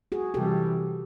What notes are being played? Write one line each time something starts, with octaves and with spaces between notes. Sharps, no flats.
F#4 G#4
C3 E3 G3 G4 A4